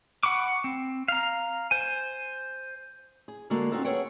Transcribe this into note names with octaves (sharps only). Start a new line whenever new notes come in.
F#5 B5 C#6 D6
C4
F5 A#5
C5 G#5
G#4
D3 G#3 A#3 F#4 A4
C4 C#4 D#4 F4 F#4 A4
G#4 A4 B4 C#5 F#5 G5